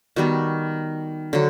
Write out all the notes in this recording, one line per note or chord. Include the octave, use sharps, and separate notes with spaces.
D#3 G3 B3 F#4
D3 F#3